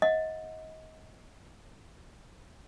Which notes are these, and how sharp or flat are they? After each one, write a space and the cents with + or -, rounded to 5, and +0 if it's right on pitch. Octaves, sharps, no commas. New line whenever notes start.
D#5 +25 F#5 -30